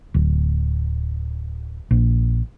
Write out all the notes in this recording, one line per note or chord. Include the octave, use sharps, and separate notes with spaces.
D1
A#1